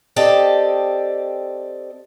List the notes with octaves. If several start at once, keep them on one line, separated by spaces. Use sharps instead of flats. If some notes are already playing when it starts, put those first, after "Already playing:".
C4 G4 A4 D5 D#5